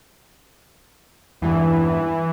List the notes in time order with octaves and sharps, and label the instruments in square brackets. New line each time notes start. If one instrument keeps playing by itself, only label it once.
[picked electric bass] E2 G2 [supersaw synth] E3